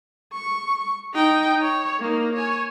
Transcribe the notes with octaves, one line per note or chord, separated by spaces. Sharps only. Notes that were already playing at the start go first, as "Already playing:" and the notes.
C#6
D#4 G5
C#5
A#3 D#4
C#5 G#5